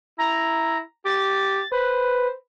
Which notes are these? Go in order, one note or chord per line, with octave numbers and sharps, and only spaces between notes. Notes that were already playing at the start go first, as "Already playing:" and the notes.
E4 A#5
G4 A6
B4 C5